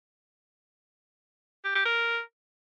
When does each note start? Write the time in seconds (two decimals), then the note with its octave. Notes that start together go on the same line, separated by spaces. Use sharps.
1.65 G4
1.75 G4
1.85 A#4